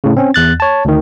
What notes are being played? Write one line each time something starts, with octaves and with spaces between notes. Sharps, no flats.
A2 C#3
C4 C#4
E2 F#6 A6
C#5 A5
D2 D#3